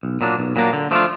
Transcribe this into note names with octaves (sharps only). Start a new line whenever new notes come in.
B1
A#2 F#3 A#3 D4
B1
A#2 F#3 A#3 D4
D3
F3 A3 D4 F4